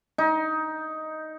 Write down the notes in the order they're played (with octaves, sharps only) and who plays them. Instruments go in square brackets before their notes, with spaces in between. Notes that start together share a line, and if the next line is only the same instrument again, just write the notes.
[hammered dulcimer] D#4